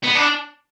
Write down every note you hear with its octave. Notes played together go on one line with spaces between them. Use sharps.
B3
D4